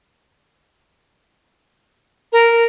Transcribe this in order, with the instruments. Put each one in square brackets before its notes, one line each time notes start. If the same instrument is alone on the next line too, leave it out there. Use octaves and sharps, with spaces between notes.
[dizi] A#4